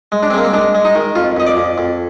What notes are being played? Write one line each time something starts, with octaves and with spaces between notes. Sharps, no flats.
G#3
D4
C4
G#3 A#3
C4
G#3 D4
G#3
D#4
D#3
F2 F4
F2 D#5
D5
F2
F2